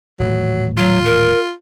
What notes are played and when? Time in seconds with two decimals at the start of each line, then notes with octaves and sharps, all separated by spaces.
0.20 D#1 A2 E3 F#3
0.77 F#3 F4
1.05 A#4